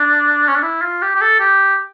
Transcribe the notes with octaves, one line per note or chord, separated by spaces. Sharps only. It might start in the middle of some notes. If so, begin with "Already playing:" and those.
Already playing: D4
C#4
D4
E4
F4
G4
G4
A4
G4